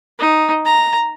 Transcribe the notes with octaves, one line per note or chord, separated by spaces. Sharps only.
D#4
A#5